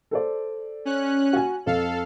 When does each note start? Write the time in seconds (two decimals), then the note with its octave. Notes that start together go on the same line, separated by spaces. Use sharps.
0.11 A4 C5 D5
0.85 C#4 F#6
1.33 F#4 G#5
1.66 F2 A4 F5